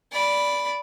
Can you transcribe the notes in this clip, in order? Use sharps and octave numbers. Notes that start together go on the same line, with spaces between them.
D5 B5